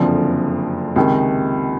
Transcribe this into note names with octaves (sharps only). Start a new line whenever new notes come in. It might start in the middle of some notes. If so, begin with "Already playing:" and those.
Already playing: F#1 F2 D3 F3
C#2 C3 D#3